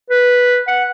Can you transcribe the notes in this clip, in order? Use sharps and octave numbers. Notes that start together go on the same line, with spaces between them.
B4
F#5